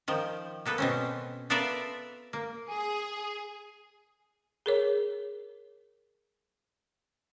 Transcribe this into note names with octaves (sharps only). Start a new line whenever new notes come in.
D#3 F3
A#3 B3 A4 B4
B2 C4 C#4
B3 F4 A4 A#4 D5 E5
A#3
G#4
G#4 A#4 C#5